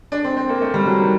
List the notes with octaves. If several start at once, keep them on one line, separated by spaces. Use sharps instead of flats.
D4
C4
C4
A#3
A3
G3
F#3
D#3